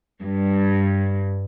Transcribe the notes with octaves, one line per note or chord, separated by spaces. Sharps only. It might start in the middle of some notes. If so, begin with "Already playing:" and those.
G2